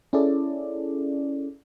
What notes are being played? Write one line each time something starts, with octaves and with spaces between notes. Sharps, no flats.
C#4 E4 G#4 A4 D5